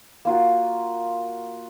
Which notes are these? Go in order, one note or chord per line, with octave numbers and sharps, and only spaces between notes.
A#3 F4 F#4